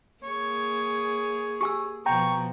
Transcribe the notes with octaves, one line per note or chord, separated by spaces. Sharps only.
A#3 G#4 C#5
G4 G#5 E6
B2 F3 G5 A#5 C#6